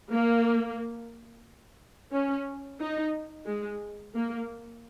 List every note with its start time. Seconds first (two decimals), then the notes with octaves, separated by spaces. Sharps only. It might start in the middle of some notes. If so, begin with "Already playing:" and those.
0.11 A#3
2.12 C#4
2.80 D#4
3.46 G#3
4.14 A#3